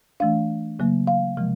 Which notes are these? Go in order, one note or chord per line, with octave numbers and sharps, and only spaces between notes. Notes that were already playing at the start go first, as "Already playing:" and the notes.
E3 A3 D4 F5
C#3 F#3 A#3
F5
C3 F3 G#3